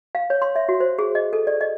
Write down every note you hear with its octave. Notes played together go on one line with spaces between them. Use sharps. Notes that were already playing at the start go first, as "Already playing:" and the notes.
F5
C#5
C6
E5
F#4
C5
G#4
D#5
A4
D5
D#5